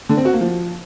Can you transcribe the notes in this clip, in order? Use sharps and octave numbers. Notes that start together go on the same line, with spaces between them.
D3
C4
F#4
A#3
F3